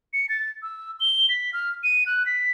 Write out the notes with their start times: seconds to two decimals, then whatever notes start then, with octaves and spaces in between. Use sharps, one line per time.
0.13 C#7
0.29 A6
0.62 E6
1.00 G7
1.29 B6
1.53 F6
1.84 D#7
2.06 F#6
2.26 B6